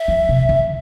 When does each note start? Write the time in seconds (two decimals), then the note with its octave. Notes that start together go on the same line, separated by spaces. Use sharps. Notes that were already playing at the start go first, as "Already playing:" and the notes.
Already playing: E5
0.08 F3
0.29 C3
0.49 D3